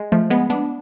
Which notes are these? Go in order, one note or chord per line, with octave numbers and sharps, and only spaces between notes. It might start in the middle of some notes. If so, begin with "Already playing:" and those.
Already playing: G#3
F3 A3
G#3 B3
B3 D4